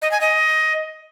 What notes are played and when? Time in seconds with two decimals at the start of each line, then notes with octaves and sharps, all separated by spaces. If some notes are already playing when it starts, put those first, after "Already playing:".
0.02 D#5
0.11 G#5
0.21 D#5